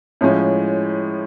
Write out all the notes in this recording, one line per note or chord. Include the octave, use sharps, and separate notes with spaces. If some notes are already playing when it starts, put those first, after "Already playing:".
A2 F3 G#3 C#4